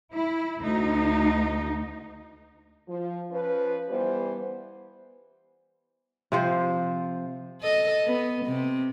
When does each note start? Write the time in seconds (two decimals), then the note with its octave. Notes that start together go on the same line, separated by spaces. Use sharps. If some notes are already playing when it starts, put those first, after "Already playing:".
0.13 E4
0.60 D2 D#4
2.88 F3
3.30 F3 C#4 F4 B4
3.89 E3 G3 B3 C5
6.32 C3 F3 C5
7.61 A4 D#5
8.05 B3
8.46 C3